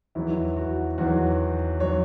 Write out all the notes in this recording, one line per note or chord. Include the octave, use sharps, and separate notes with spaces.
E2 D#3 F#3 E4
F#4
E2 D#3 F#3 F#4
D#3 F#3 C#5